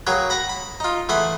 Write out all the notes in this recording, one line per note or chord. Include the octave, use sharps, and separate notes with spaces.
F#3 A#3 G#4 B4 C#5 G5
F#5 A#5 B5
B5
D#4 F4
E3 A3 G#4 F#5 B5 C6